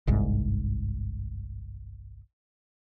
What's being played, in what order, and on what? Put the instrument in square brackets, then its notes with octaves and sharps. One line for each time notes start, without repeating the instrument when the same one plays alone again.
[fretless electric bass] G1 C2 G#2